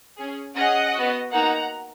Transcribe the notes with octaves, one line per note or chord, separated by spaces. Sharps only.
C#4 G#4
C#4 G#4 D#5 F#5
B3 F#4
A#3 D#4 F#4 F#5 A#5